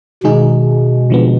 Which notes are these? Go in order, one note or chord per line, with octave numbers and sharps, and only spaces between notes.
B2 D#3 G#3 D#4 G#4
D3 F3 G#3 B3